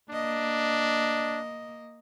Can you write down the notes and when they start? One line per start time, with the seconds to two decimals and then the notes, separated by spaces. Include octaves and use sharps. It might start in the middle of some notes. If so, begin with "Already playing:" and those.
0.10 A#3 D4 D#5